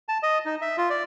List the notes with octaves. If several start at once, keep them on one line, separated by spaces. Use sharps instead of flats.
A5
D#5
D#4
E5
F4
D5